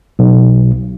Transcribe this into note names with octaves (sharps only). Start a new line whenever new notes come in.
B1